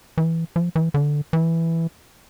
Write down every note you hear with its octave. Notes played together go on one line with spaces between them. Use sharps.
E3
F3
E3
D3
E3